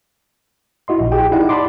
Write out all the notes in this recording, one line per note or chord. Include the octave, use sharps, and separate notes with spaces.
E4 F#4 D#5 C6
A#1
G4 G#4 G5
D#4 E4 G4 D5 F#5
D5 A5 B5 C6 D6